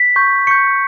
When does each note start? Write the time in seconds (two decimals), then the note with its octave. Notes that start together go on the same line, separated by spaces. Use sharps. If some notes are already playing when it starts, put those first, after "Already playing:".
Already playing: B6
0.16 C#6 G6
0.47 C#6 G6 C#7